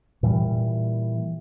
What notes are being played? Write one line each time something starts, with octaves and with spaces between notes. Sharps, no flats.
A#2 E3 G3